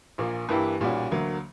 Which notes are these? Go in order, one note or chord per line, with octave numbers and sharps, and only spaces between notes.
A#1 A#2 A#3
G2 E3 A#3 E4 G4
B1 A#2 G3 C#4 F#4
D2 D3 F#3 A#3